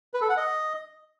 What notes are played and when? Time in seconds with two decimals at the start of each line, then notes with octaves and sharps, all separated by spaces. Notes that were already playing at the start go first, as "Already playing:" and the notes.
0.14 B4
0.21 A4
0.29 F#5
0.37 D#5